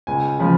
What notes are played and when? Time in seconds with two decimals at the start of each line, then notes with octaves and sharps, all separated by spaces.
0.07 C#2 G#5
0.39 C#3 F3 G#3 B5